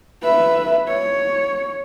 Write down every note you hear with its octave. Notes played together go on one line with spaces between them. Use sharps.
B4 E5
C#5